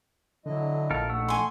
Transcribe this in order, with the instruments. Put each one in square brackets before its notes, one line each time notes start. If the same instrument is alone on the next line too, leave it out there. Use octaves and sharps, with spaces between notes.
[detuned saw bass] D3 [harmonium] F#3 E4 D#5
[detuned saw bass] A#1 [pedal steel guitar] A4 A#4 F5
[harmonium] D#3 [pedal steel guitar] A3 F#5 E6
[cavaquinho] G#5 C6